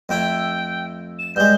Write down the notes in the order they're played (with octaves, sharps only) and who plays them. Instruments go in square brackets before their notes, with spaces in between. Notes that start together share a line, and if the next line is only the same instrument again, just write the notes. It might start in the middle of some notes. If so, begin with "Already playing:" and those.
[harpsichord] F2 A3 E4 [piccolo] G5
[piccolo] E7
[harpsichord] G2 G#3 [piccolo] G6